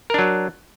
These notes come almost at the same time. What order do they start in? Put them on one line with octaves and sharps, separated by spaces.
A#4 D4 F#3